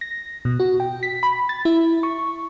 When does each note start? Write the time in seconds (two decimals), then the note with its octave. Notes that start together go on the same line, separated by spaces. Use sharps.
0.01 A#6
0.45 B2
0.60 F#4
0.80 G5
1.03 B6
1.23 B5
1.49 A6
1.65 E4
2.03 C#6